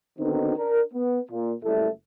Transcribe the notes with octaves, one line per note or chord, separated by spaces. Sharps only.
D3 D#3 B3 C4 D#4 F#4
D4 A#4
B3
A#2
F#1 G3 A3 E4 A4 E5